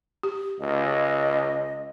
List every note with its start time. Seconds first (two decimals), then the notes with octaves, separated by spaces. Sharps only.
0.23 G4
0.60 C#2 D#5